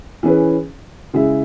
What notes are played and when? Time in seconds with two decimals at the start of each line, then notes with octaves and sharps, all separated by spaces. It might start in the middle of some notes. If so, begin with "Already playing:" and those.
0.23 E3 C#4 G#4 B4
1.13 C#3 G#3 E4 G#4 E5